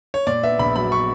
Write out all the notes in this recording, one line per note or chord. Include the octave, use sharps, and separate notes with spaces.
C#5
A#2 D5
B3 E5
A#1 B5
F#3 B5
B3 C#6